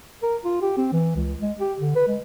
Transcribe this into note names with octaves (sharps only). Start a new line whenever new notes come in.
A#4
F4
G4
C4
E3
C#2
G#3
G4
D3
B4
G#3